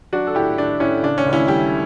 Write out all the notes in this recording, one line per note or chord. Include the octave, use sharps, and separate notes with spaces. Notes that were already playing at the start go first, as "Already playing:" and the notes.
F#3 D4 F#4
A4
A2 E4 G4
A2 D4
A2 C#4 E4
C#3 D4
C#4
C#2
C#4 E4
G3 E4 G4